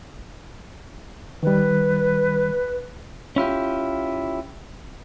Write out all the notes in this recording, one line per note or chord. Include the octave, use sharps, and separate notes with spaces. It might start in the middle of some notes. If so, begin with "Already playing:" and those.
D#3 G3 B4
C#4 E4 F4 G4